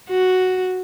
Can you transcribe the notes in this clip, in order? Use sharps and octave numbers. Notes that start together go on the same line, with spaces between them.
F#4